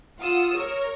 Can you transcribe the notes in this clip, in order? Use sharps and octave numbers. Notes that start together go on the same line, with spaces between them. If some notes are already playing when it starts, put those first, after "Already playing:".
F4 F#5 D#6 E6
A#4 C#5